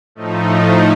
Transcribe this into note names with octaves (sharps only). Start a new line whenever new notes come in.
A2 F3 A3 D#4